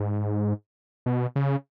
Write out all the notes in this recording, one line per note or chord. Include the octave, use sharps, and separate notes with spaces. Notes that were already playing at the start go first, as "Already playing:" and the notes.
Already playing: G#2
B2
C#3